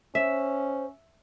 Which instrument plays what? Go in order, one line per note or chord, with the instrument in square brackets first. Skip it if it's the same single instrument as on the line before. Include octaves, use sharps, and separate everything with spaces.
[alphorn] C#4 [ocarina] C5 [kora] E5